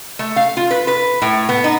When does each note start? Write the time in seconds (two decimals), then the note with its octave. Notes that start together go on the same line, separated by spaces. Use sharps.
0.19 A3
0.36 F5
0.57 F4
0.71 B4
0.87 B4
1.22 A2
1.49 B3
1.64 D#4